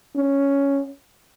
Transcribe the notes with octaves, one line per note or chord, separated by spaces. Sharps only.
C#4